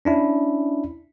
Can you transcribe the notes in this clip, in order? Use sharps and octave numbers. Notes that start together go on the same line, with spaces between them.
C#4 D4 E4